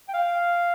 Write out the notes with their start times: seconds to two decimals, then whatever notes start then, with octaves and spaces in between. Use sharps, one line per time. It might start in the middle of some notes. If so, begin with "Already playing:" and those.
0.09 G5
0.14 F5